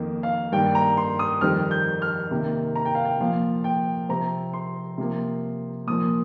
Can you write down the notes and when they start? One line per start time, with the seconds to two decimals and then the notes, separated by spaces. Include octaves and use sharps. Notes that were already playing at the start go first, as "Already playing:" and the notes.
Already playing: F2 D#3 A#3
0.23 F5
0.52 G2 D#3 A#3 G5
0.75 A#5
0.97 C6
1.19 D#6
1.41 F2 D#3 G3 C4 F6
1.71 G6
2.02 F6
2.31 C3 D#3 A#3
2.76 A#5
2.85 G5
2.95 F5
3.05 G5
3.20 A#2 F3 A#3 F5
3.64 G5
4.09 C3 F3 C4 A#5
4.53 C6
4.98 C3 F3 A#3
5.87 A#2 F3 A#3 D#6